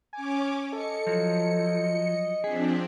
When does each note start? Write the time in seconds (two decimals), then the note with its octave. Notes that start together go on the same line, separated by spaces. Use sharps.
0.13 C#4 C#5 G#5 D6
0.73 A4 D#5 C#7
1.07 F3 F#3
2.44 F3 C4 D4 G#4 B6